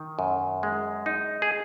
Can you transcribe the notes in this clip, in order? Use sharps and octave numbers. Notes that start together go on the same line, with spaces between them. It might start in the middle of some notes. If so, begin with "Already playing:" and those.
Already playing: D#3
F#2
G#3
D#4
G#4